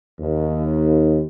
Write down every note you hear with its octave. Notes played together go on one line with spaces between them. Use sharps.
D#2